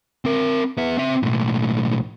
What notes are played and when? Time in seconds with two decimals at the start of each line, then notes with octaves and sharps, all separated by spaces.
0.25 C4 A#4
0.77 B3 E5
0.97 C4 E5
1.23 B1 A2